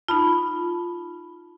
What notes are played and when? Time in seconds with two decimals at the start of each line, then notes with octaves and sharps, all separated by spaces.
0.08 D#4 F4 A5 B5